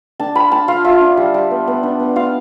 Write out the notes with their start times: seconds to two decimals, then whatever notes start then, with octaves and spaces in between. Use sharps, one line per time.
0.20 D4 A5
0.35 F4 B5
0.52 F4 A5
0.68 F4 F5
0.84 F4 E5
1.01 D4
1.17 G3
1.34 G3
1.51 B3
1.67 B3
1.83 D4
2.00 B3
2.16 F4 F5